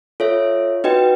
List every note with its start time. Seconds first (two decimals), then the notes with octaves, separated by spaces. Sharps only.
0.20 F4 A4 C#5 E5
0.84 D#4 F#4 B4 D#5 G5